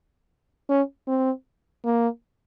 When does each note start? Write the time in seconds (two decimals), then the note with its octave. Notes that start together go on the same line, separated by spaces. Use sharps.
0.70 C#4
1.08 C4
1.85 A#3